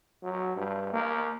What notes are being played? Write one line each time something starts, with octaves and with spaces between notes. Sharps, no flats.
F#3
G2
A#3